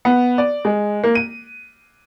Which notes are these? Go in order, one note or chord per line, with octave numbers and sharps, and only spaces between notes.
B3
D5
G#3
A#3
D#7